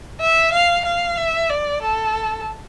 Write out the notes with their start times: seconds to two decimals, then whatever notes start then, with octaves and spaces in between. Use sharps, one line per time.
0.20 E5
0.53 F5
0.85 F5
1.17 E5
1.50 D5
1.82 A4